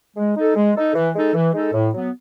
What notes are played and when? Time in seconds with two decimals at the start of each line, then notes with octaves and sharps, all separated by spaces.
0.17 G#3
0.36 D#4 A4
0.56 G#3
0.75 D#4 A4
0.95 E3
1.15 G#3 D#4 A4
1.34 E3
1.54 G#3 D#4 A4
1.74 A2
1.93 F#3 B3